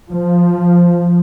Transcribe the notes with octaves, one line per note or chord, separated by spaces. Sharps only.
F3